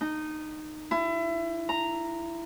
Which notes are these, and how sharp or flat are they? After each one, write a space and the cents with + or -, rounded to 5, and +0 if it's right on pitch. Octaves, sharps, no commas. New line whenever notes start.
D#4 -15
E4 +25
A#5 -5